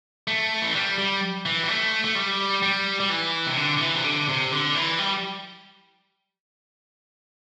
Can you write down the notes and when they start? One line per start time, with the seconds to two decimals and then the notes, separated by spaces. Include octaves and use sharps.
0.28 A3
0.62 E3
0.75 G3
0.98 G3
1.46 E3
1.63 G3
1.69 A3
2.05 A3
2.15 G3
2.62 G3
3.00 G3
3.10 E3
3.47 C3
3.57 D3
3.77 D3
3.81 E3
3.95 C3
4.04 D3
4.28 C3
4.52 D3
4.75 E3
4.98 G3